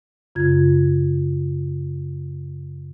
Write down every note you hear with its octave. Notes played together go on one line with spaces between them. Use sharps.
F#2 C#3 F4 G#6